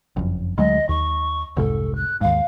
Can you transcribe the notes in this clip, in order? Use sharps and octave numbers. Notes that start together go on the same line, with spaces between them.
F#1 F2
D2 F#3 G#3 D#5
D#2 C#6
F1 C2 G#2 A4
F#6
D#2 G#2 F5